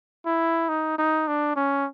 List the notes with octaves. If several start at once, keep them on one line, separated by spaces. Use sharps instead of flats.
E4
D#4
D#4
D4
C#4